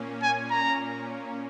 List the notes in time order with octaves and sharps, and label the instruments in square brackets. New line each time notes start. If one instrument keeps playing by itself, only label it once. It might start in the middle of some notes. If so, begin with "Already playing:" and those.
Already playing: [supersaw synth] A#2 A#3 C#4
[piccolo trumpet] G#5
A#5